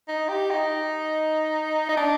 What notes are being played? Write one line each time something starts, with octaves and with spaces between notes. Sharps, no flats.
D#4
G4
D#4
D#4
D4